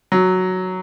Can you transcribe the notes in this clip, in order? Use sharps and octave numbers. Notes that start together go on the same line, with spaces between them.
F#3